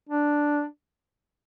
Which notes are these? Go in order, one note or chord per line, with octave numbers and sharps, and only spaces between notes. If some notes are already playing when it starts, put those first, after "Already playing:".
D4